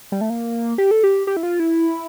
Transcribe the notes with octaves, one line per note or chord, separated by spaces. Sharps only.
G3
A3
A#3
G4
A4
G4
G4
E4
F4
E4